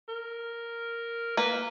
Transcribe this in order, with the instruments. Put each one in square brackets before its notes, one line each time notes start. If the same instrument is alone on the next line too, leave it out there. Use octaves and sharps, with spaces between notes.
[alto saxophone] A#4
[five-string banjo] A#3 [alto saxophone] B4